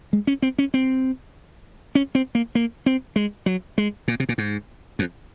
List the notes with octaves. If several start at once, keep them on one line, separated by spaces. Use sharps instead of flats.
G#3
C#4
C4
C#4
C4
C#4
C4
A#3
A#3
C4
G#3
F#3
G#3
A#2
C3
A#2
G#2
F2